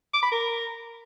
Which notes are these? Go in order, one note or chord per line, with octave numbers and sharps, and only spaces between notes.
D6
B5
A#4